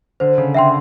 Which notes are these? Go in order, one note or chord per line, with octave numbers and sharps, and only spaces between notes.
D3 C5
C#3
D3 E5 G5 C6